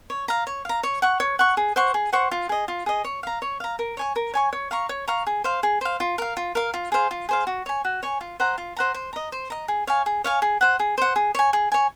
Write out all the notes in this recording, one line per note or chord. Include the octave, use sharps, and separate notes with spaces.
C#5
F5 A#5
C#5
F5 A#5
C#5
F#5 C#6
C#5
F#5 C#6
G#4
C5 F#5 C#6
G#4
C5 F#5 C#6
F4
G#4 D#5
F4
G#4 D#5
C#5
F5 A#5
C#5
F5 A#5
A#4
C#5 G#5 C#6
A#4
C#5 G#5 C#6
C#5
F5 A#5 C#6
C#5
F5 A#5 C#6
G#4
C5 F5
G#4
C5 F5
F4
A#4 F5
F4
A#4 F5
F4
G#4 C5 F5
F4
G#4 C5 F5
F#4
C#5 G#5
F#4
C#5 G#5
F4
C5 F#5 A#5
F4
C5 F#5 A#5
C5
D#5 A#5
C5
D#5 A#5
G#4
C#5 F5 G#5
G#4
C#5 F5 G#5
G#4
C5 F#5
G#4
C5 F#5
G#4
C#5 G#5
G#4
C#5 G#5